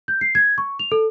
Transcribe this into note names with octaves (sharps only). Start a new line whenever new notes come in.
G6
C7
G#6
C#6
F7
A4